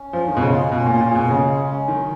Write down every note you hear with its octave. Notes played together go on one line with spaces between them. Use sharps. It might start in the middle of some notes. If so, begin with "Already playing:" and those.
Already playing: C#4
F3 F4
D#3
B2 G#3
C#3
F4
B2 C#4
A#2 F4
A#2
B2 G#4
C#3 G#3
C#4
C#4
D#3 F#3